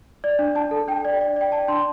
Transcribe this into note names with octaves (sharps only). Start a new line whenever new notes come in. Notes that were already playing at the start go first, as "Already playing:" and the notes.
D5
D4
D4 A5
A4
D4 G5
D5
D5
D5 G5
D5 A5
D4 C6